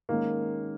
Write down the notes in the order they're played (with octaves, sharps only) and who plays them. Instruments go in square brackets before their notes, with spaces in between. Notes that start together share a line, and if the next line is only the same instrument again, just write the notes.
[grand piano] D#3 G#3 C#4 [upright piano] A#3